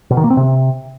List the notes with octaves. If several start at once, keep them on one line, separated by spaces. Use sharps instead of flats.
B2
D#3
A#3
C4
C3